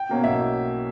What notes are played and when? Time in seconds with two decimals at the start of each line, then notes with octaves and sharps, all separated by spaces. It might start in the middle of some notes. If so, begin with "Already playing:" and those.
Already playing: G5
0.09 B2 A#3 C#4
0.24 B1 E5